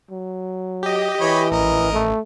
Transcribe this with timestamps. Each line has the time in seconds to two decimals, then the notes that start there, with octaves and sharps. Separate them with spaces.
0.11 F#3
0.83 G4 D#5
1.20 E3 C#5 B5
1.52 A1 A#4 D#5
1.93 A3